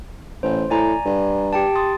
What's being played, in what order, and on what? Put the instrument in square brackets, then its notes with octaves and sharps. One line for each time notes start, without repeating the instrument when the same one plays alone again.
[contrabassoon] A1 [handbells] C5
[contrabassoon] A2 [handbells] D5 G#5 A#5
[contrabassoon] G2
[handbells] G4 G5 A5
C6 D#6 A6